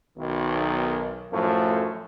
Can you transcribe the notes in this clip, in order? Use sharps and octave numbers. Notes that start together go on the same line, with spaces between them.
B1 D#3
F#2 A2 F3 A3